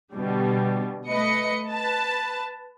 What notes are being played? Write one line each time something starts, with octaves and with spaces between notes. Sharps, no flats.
B2 D3 G3
A3 B4 D#5 C#7
B4 A5